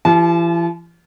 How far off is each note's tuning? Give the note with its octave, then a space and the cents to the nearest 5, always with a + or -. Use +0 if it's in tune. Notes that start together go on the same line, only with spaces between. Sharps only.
E3 +45 G4 +0 A5 -35